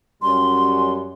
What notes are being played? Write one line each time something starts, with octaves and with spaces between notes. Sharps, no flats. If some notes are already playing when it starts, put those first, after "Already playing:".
F#2 G3 C#4 C6